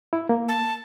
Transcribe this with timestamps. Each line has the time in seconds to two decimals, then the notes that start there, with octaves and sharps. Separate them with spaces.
0.13 E4
0.29 A#3
0.48 A5